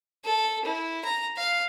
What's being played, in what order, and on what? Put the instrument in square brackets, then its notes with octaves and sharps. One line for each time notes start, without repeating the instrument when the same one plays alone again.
[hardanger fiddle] A4
E4
A#5
F5